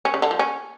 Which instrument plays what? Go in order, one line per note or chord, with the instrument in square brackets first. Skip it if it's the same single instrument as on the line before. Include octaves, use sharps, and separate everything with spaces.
[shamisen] C#4
C#3
D3
F3
C#4